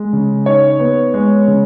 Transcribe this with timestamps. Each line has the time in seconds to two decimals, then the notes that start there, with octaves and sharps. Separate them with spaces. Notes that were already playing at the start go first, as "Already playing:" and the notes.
Already playing: G#3
0.13 C#3
0.46 D#4 C#5
0.80 B3
1.14 G#3
1.48 C#3